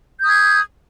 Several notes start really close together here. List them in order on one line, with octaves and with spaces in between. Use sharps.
G6 D#6 G#6